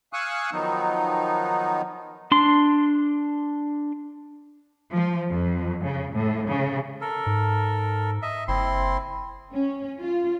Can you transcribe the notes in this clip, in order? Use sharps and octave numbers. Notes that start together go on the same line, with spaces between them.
F5 G#5 C#6 D#6 E6 F#6
D#3 F3 F#3 B3 D#4
D4 C6
F3
F2
C#3
A2
C#3
A4 A#4
G#2
D#5 E5
F#1 C4 E4 C6
C#4
F4